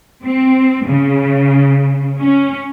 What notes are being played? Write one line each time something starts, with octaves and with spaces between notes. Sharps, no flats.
C4
C#3
C#4